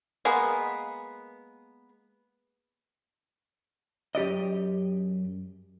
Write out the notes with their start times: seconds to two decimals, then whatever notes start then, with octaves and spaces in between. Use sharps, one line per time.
0.25 G#3 A#3 B3
4.15 F#2 G4 D5 D#5